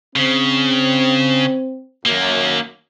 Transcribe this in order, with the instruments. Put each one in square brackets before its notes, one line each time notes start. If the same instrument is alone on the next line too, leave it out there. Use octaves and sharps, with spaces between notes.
[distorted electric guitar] C#3 [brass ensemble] C4
[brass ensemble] F#2 [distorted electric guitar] D#3 A#3